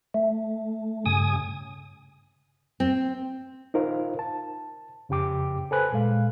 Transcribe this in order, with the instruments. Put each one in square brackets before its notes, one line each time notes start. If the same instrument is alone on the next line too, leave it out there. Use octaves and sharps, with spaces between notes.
[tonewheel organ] A3
G2 C#3 G#5 D#6
[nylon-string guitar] C4
[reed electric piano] D#4 F4 A#4 C5 F5
A5
F2 C#3 G4 G5 D6
A4 B4 C5 G#5 B5 F#6
A#2 G#3 F5